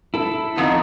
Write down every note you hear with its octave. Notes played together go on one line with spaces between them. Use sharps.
E4 A4
F2 B3 D#4